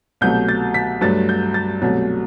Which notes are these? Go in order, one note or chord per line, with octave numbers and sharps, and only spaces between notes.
C2 B2 F#3 A3 G6
A6
B6
G2 F#3 A3 A6
G6
A6
C2 B2 F#3 A3